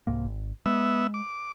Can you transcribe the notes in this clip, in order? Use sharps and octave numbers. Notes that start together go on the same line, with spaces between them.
C2 G#2 A#3
G#1
G#3 B3 E5
D6